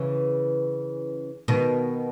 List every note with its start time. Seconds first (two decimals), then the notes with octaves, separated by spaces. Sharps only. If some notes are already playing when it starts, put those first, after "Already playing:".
Already playing: C#3 E3
1.48 B2 D#3